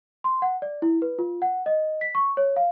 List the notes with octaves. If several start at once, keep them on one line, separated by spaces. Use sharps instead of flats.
C6
F#5
D5
E4
B4
F4
F#5
D#5
B6
C#6
C#5
F5